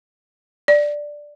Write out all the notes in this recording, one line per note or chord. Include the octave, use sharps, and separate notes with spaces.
D5